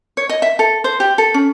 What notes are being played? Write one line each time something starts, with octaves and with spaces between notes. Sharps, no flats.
C#5
D#5
E5
A4
C5
G4
A4
C#4